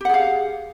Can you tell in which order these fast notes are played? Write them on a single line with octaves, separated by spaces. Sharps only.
G4 F#5 G#4 F5